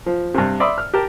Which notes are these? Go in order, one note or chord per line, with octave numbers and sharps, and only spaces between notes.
F3
G2 C3
D5 E5 B5 C6 D#6
F6
G4 A#4 A5